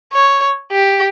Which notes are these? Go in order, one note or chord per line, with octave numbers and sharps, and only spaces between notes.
C#5
G4